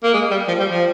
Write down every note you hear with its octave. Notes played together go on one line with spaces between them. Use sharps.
A#3
G#3
G3
F3
G3
F3